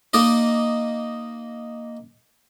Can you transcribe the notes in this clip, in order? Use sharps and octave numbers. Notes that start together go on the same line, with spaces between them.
A#3 D#4 D5 D#5